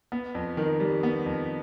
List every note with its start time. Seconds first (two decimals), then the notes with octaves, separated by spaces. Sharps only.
0.12 B3
0.35 F2
0.57 D#3
0.80 G3
1.03 B3
1.26 F2